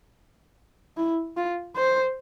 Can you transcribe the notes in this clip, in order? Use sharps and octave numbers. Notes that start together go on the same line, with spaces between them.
E4
F4
C5